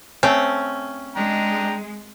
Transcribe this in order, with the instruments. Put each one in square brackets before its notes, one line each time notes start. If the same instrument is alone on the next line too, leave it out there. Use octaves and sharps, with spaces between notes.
[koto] A3 C4 [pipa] C#4
[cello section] G#3 [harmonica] D4 G5 A#5